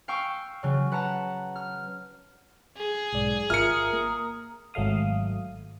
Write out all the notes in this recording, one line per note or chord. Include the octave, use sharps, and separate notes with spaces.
F5 G5 C#6 E6
C#3 F#3
B4 F#5 A5 A#5
F6
G#4
B1 G#2 D5
G#1 F4 A#4 E5 A#5 D#6 F6 C#7
A#3
G#1 F#3 A3 F5 D#6